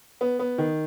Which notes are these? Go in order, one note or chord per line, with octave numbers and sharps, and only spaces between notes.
B3
B3
D#3